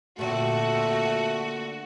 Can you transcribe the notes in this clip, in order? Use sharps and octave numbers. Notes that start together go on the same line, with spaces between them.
A#2 D3 A3 C4 F#4